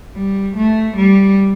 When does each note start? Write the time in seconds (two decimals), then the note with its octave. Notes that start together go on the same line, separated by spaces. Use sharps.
0.14 G3
0.56 A3
0.97 G3